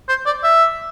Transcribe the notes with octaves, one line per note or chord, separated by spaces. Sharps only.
C5
D5
E5